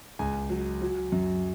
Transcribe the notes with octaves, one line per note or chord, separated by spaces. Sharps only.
C#2 G#5
F#3
F#3
F#2